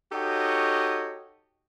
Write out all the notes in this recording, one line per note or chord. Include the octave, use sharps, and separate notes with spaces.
D#4 F#4 G4 A4 C#5 D#5